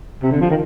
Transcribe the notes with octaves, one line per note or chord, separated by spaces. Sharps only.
C3
D3
F3
D#3